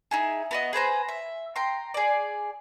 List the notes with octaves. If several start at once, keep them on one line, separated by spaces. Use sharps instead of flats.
D#4 E4 G#4
B3 F#4 D#5
G#4 B4 C5 A#5
E5
G5 A#5 C6
G#4 D5